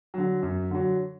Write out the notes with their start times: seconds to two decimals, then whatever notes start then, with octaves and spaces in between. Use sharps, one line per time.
0.14 D3 F#3
0.42 F#2
0.71 D3 F#3